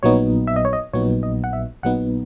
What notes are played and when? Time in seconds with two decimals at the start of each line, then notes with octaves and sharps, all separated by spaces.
0.03 A#1 A#2 F#3 B3 D#4 C#5
0.47 E5
0.56 D#5
0.65 C#5
0.73 D#5
0.93 A#1 A#2 F#3 B3 D#4 C#5
1.23 D#5
1.44 F#5
1.53 E5
1.83 A#1 A#2 F#3 B3 D#4 F#5